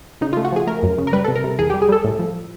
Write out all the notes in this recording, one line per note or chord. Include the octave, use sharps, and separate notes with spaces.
C#3 D#4
F4
A3
F#4
F3 G#4
A3 A#4
F#2
C#3
A#4
G3 B4
C3 A4
A#4
C3
E2 G#4
G4
G3
G#4
G3 A4
A2
F3